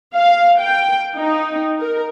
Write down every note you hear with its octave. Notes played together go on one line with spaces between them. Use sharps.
F5
G5
D#4
A#4